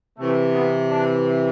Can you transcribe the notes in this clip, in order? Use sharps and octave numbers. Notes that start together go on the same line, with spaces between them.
C3 E3 A3
B3
D4